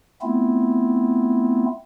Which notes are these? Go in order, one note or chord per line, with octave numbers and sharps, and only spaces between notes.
A3 B3 C4 E4 F4